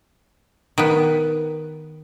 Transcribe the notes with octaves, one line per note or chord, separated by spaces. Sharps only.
D#3 B3